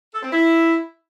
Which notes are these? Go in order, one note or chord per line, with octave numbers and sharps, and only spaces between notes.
A4
C4
E4